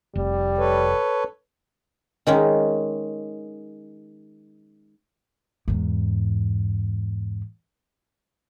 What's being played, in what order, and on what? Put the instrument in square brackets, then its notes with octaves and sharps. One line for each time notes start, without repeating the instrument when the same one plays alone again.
[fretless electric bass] F1 [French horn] G3
[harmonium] A4 B4 C#5
[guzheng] D#3 G#3 C#4
[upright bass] E2 G#2